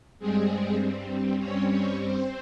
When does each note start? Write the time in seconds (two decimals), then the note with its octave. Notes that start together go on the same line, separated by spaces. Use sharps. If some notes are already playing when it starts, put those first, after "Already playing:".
0.19 G2 G3 G#3 C4 G#4
1.39 C#4 C#5
1.68 C#4 C#5
1.98 C4 C5